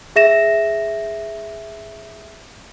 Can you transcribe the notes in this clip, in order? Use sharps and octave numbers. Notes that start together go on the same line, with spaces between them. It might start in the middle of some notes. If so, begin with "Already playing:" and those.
G#4 E5 A#6 E7